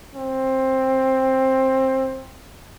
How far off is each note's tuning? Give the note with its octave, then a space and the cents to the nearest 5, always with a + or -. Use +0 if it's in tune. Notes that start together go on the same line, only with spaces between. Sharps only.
C4 +15